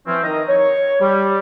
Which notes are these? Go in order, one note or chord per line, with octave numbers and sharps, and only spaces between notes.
E3 F3 C4 C#4
D#3 D#5 A#5 D#6
C#5
G3